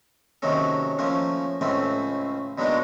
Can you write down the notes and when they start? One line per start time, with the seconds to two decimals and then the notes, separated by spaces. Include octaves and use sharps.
0.42 C3 D#3 F#3 A#3 C#4 A4
0.99 F3 A3 A#3 C#4
1.61 C#2 A2 A3 C4 C#4
2.58 B2 F#3 G#3 A#3 D4 D#4